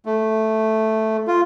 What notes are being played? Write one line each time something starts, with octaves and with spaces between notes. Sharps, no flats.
A3
F4